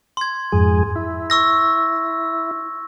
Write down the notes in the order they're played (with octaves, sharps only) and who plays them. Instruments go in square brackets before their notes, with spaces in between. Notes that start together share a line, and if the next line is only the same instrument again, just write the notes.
[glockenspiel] C6 G#6
[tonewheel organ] F2 G#2 G#4
E4
[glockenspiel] C#6 E6 A#6